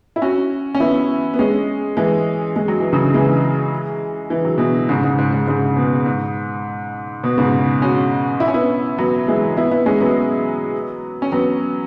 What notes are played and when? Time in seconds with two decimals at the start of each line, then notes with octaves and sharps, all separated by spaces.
0.16 E4
0.22 C#4 F#4
0.75 C#4
0.80 B3 E4
1.34 B3
1.39 G#3 C#4
1.97 E3 G#3
2.56 G#3
2.68 F#3
2.80 E3
2.93 C#3 F#3
3.14 E3 G#3
4.30 E3
4.45 F#3
4.58 B2 E3
4.89 G#2 C#3
5.04 G#2
5.18 G#2
5.33 G#2
5.47 G#2 C#3
5.77 B2
6.06 G#2
7.24 B2
7.38 G#2 C#3
7.82 C#4 F#4
8.40 E4
8.48 C#4
8.54 B3 E4
8.98 F#3 B3
9.28 E3 G#3
9.57 B3 E4
9.71 B3 E4
9.86 G#3 C#4
10.01 F#3 B3
11.22 C#4
11.32 F#3 B3